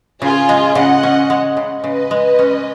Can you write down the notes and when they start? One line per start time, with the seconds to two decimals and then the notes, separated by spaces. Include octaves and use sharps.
0.22 C#3 F4 G#4
0.49 G#3
0.75 C#3 D#5 F#5
1.03 C#4
1.30 G#3
1.57 C#3
1.84 C#3 B4 D#5
2.11 G#3
2.39 C#4